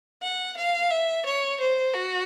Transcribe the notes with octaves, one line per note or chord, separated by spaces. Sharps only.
F#5
F5
E5
C#5
C5
F#4